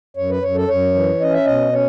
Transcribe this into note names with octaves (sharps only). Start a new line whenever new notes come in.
F#2 C#5
B4
F#2 C#5
A4
F#2 C#5
E3
C#4 D#5
E5
B2 D#5
C#4 C#5